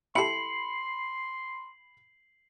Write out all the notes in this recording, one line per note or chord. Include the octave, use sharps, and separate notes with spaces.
E4 G4 A4 B5 C6 C7 C#7 F#7